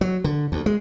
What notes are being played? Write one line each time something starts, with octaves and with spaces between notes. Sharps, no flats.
F#3
D3
D2
G#3